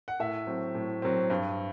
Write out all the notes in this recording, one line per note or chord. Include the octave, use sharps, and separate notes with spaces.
F#5
A2 E5
F#3 C4
A2
F#3 C4
G2